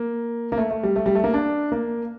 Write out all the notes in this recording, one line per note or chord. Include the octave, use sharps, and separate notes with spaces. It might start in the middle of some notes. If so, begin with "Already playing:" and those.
Already playing: A#3
A#3
A3
A3
G3
A3
G3
A3
A#3
D4
A#3